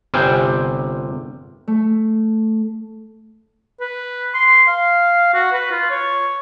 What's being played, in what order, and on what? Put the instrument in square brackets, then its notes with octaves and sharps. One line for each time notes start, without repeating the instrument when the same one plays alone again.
[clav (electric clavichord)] G1 C3 G3 C5 G5 G#5
[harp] A3
[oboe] B4
C6
F5
F#4
B4
F4
C#5